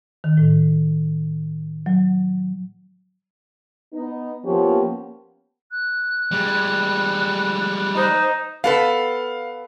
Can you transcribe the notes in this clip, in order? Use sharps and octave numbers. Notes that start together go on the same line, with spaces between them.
D#3
A2
F#3
B3 D#4
F3 A#3 B3 C#4 G4
F#6
G3 G#3
D#4 C5
B3 A4 B4 F5